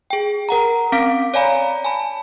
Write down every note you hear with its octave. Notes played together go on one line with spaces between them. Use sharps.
G#4 G5
A#4 F#5 A#5
C4 C#4 F5 D6 B6 D7
C#5 D5 F5 G#5 A#5 B5
G#5 A5 B5